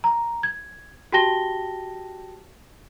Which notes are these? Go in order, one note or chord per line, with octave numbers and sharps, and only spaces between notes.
A#5
G#6
F#4 G4 G5 A5 A#6 G7